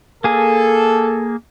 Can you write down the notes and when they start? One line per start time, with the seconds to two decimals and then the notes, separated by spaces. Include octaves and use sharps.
0.24 A#3 G#4 A4